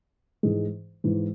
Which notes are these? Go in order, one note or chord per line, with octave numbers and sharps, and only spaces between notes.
G#2 E3 G#3
G#2 E3 G#3